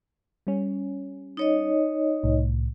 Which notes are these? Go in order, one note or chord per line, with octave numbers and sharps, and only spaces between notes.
G3 C#4
D#4 C#5 D#5
C2 A2